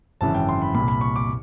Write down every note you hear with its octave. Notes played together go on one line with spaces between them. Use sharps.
G#1 F#2 C#3 E3 A5
G5
C6
B5
C2 A#2 B5
B5
C#6
D6